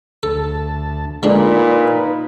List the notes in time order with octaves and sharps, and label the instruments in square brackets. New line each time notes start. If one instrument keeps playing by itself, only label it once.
[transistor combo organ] D2 A5 [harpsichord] A4
[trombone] A#2 [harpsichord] D3 G#3 D4 [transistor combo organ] D#4 B4